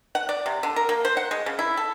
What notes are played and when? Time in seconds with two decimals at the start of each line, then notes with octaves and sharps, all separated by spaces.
0.15 F#5
0.29 D5
0.46 C3
0.63 D3
0.76 A#4
0.89 A#3
1.05 C5
1.17 F#5
1.31 G#3
1.46 C#3
1.59 E4
1.77 A4